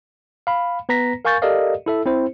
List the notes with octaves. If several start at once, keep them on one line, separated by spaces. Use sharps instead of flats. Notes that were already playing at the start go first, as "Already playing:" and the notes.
F5 B5
B3 B4 A#5 A#6 B6
A#4 F5 G#5 C#6 G6 A6
G4 A4 A#4 D5 D#5 F5
E4 A4 E5
C4 E4 C5